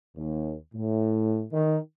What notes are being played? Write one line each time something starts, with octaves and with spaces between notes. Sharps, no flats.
D#2
A2
D#3